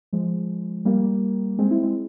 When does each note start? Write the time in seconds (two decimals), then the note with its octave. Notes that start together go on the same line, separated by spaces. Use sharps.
0.13 F3 G#3
0.85 G3 A#3
1.59 G#3 C4
1.71 C4 E4
1.83 G#3 C4